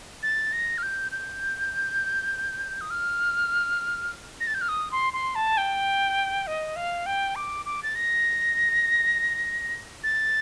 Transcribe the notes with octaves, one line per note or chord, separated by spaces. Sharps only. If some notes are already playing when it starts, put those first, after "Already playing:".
A6
A#6
F6
G6
G6
D#6
F6
A#6
A6
G6
F6
D#6
C6
C6
A5
G5
D#5
F5
G5
D6
D6
A6
A#6
A6